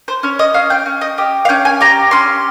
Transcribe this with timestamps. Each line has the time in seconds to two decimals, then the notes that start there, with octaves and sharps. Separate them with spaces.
0.08 C5
0.23 C#4 C#5
0.39 D#5
0.54 C#4 F5
0.70 G5
0.86 C#4
1.01 D#5
1.18 G4 D#5
1.45 F5
1.49 C#4 G5
1.65 G#5
1.81 G4 A#5
2.11 C#4 C6